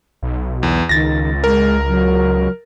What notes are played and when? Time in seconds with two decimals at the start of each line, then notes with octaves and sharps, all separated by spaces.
0.23 B1
0.63 E2
0.89 C#2 D#3 A6 A#6
1.44 G#3 A#4
1.87 F#3